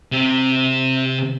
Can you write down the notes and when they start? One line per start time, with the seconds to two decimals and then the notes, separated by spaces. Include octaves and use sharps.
0.12 C3